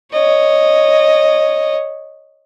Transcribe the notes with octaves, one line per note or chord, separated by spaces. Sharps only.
C#5 D#5